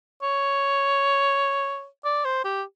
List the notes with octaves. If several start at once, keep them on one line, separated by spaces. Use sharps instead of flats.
C#5
D5
C5
G4